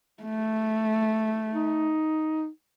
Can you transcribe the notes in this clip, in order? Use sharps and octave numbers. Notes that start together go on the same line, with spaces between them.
A3
D#4